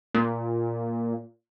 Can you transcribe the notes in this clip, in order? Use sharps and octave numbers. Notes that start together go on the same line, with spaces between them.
A#2